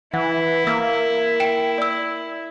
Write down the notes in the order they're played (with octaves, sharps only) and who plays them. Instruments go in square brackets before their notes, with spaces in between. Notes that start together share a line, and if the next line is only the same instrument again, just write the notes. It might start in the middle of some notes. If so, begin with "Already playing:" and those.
[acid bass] E3 [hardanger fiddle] E4 [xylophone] F#5
[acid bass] A#3 [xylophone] E6
[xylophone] G5 D7 E7
D5 E6